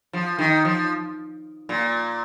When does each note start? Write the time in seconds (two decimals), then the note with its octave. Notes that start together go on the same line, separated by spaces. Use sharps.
0.13 F3
0.39 D#3
0.65 F3
1.69 A#2